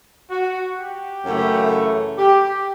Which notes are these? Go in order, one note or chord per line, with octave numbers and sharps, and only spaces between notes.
F#4
G4
F#2 C#3 E3 A3
G4